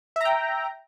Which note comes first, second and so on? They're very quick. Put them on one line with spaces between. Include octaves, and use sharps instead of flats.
E5 A#5 G5